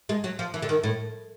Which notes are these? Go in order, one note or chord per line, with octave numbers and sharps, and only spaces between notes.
G#3
F#3
F3
E3
D3
D#3
A2